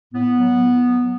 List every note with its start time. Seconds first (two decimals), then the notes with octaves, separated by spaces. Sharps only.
0.13 A2 B3
0.38 F#3
0.63 A2
0.87 F#3